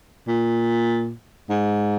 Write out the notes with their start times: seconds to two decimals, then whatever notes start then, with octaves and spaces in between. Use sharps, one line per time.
0.28 A#2
1.49 G#2